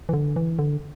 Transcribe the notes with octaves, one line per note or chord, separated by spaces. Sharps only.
E3
D3
E3
D3